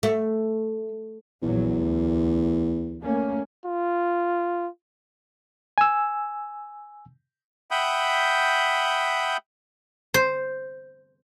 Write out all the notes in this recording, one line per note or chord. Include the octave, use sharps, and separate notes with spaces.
A3
A#1 E2 F#3
D2
A3 A#3 C#4
F4
G#5 E6
E5 F#5 G5 B5 D#6 G6
C5